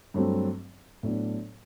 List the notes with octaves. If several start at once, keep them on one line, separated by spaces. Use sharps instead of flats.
G2 F#3 A3 C4
A2 F#3 B3 D4